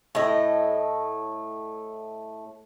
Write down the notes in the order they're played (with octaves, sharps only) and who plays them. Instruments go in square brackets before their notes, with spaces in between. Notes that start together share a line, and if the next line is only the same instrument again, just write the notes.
[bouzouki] A2 A3 D#5